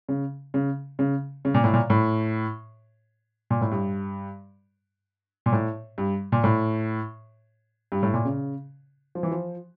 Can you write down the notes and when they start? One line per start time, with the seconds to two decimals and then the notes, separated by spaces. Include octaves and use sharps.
0.09 C#3
0.54 C#3
0.99 C#3
1.45 C#3
1.54 A#2
1.64 A2
1.73 A#2
1.90 A2
3.50 A#2
3.61 A2
3.71 G2
5.46 A#2
5.52 A2
5.98 G2
6.32 A#2
6.44 A2
7.92 G2
8.03 A2
8.14 A#2
8.25 C#3
9.15 F3
9.23 E3
9.31 F3